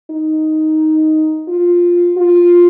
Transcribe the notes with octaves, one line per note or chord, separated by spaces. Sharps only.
D#4
F4
F4